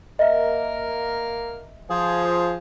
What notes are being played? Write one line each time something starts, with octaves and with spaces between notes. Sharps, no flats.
A#3 A#4 D#5 E5
F3 G#4